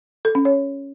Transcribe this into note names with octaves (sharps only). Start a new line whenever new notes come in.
A4
C#4
C#5